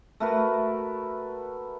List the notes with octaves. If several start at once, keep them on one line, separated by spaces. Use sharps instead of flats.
A3 F#4 A#4 B4